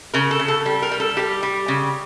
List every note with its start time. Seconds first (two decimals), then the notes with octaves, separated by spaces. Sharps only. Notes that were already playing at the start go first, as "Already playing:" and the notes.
0.14 C#3 A#4
0.31 A4
0.39 C#3
0.48 A4
0.66 G3
0.82 A#4
0.91 G3
1.00 A4
1.17 G3 G4
1.43 G3
1.68 C#3